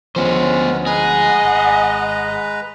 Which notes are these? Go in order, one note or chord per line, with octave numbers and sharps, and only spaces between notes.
D2 F3 G#3 B3 C#4 C5
G#3 G#4 B4 D#5 F#5 A#5
G#1